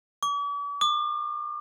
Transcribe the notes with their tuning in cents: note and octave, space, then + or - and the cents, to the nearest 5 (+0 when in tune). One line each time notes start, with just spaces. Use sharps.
D6 -45
D6 +45